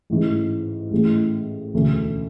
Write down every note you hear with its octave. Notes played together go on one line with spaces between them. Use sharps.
A1 G#2 E3
A1 A2 G#3
E1 D2 C#3